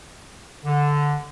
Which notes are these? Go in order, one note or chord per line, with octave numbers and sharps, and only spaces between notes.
D3